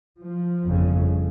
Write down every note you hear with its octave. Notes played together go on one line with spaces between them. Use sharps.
F3
G1 F2 C#3